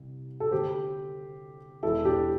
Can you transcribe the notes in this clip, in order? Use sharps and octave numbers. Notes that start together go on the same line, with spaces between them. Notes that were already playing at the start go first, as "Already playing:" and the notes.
Already playing: C2 C3
A4
D2 D3 G4 C5
E1 E2 E3 E4 A4
D4 G4